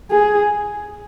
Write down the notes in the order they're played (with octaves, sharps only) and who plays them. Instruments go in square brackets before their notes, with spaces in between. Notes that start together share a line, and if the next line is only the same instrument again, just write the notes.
[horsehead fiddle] G#4